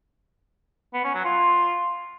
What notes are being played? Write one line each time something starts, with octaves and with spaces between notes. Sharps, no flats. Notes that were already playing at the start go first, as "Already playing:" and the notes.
B3
C#4
F#3
F4